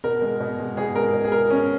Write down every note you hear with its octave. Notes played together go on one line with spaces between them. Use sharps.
B2 A#4
G#3
B2
G#3
B2 G#4
G#3 A#4
B2
G#4
G#3 A#4
B2 C#4